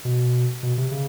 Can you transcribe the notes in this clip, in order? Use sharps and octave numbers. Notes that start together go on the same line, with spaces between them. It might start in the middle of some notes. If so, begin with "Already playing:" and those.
B2
B2
C3
C#3